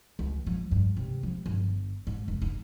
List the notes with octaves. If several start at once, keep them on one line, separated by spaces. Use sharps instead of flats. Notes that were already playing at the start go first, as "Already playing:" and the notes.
C#2
F3
G2
C3
F3
G1
G#2
F1
D#4